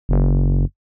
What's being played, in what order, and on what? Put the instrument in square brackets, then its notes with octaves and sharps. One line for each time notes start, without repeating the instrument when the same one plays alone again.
[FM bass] F#1